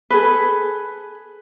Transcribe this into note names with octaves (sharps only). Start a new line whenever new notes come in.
G#4 A4 B4